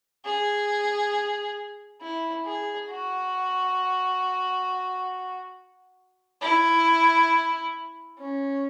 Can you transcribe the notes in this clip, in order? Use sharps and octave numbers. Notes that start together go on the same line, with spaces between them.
G#4
E4
G#4
F#4
E4
C#4